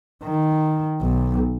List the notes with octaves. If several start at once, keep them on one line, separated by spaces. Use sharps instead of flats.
D#3
B1